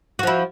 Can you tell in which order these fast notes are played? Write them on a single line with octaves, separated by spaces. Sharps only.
F#4 F3 E4